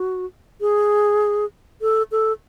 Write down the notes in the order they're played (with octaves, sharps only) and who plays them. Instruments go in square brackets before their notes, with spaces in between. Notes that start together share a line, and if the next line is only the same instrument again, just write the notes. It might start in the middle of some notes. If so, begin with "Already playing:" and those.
Already playing: [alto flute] F#4
G#4
A4
A4